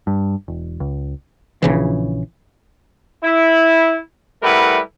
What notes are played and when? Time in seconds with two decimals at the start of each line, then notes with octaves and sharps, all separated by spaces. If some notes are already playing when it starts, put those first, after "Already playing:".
0.07 G2
0.48 E1
0.80 C#2
1.62 A#1 C#3 E3
3.23 E4
4.43 G3 A3 E4 A#4 B4 F#5